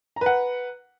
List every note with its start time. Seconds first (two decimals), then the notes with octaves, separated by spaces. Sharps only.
0.16 A#5
0.21 B4
0.26 F#5